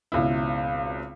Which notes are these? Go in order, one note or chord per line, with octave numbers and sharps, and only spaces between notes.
G#1 C#2 B2 E4